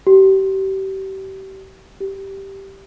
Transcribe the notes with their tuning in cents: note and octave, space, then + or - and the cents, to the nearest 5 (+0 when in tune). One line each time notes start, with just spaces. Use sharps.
G4 -30
G4 -5